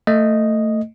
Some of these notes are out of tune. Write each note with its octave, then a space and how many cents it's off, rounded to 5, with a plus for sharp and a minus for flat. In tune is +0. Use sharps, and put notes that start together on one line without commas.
A3 +20 D#5 +0